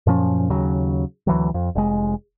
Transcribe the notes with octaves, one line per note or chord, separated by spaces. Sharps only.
F#2 A#2 F3 C#4
D#2 C#3 F#3
D2 E3 F#3
F2
F1 G#3